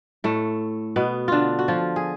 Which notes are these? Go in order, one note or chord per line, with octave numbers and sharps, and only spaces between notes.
A2 A3
B2 B3
D3 D4 F4
F#4
F3 F4
G#4